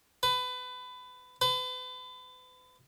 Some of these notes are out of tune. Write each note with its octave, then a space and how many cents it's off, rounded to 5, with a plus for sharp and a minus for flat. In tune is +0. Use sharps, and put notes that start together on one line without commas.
B4 +25
B4 +40